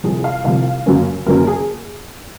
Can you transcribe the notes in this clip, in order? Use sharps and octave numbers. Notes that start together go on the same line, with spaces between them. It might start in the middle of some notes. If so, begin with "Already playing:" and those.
C2 C3 F3 G#4
F5
C2 C3 F3 F5
F#2 C#3 F#3 A#3 C#4
F#2 C#3 F#3 A#3 C#4 A#4
A#4
G#4